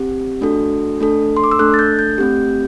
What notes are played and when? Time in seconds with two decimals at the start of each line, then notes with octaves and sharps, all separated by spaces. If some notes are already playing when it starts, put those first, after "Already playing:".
Already playing: C4 G4
0.41 A3 D4 F#4 A4
1.00 A3 D4 A4
1.37 C6
1.44 D6
1.51 E6
1.59 A3 D4 A4 F#6
1.74 A6
1.79 G6
1.99 G6
2.18 A3 C4 G4